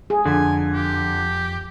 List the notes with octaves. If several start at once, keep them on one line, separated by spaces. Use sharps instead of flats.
G#4
F2 D3 G#5
G4